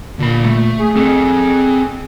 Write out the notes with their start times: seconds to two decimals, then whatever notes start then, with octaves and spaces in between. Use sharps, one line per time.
0.19 A#2 D3 B5
0.46 A3
0.79 G#4
0.96 C4 G#4 A4